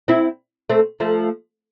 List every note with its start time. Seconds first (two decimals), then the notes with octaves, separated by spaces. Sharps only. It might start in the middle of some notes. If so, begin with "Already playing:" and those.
0.08 C4 E4
0.70 A3 C4
1.00 F3 A3